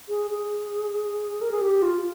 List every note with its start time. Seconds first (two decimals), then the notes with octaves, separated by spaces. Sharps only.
0.09 G#4
0.31 G#4
1.42 A#4
1.51 G#4
1.61 G4
1.82 F4